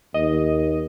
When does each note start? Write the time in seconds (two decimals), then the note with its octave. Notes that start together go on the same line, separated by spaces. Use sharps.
0.14 D#2 D#5